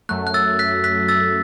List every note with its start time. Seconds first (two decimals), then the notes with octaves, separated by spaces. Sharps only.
0.09 F#2 F#3 A3 F#6
0.27 F#6
0.34 E6 A6
0.59 F#6 B6
0.84 F#6 B6
1.08 E6 A6